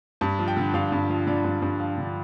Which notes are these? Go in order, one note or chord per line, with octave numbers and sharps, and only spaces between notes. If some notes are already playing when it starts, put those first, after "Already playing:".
G2 A5
F3
G5
D3
G2 F5
G2
F3
D3 D5
G2
G2
F3 F5
D3